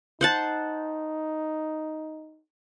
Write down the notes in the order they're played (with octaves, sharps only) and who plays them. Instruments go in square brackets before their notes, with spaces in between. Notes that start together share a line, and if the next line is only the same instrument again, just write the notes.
[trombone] D#4 [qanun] C5 F#5 A5